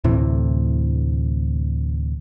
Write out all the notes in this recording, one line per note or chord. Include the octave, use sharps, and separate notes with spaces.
D2 A2 C3 E3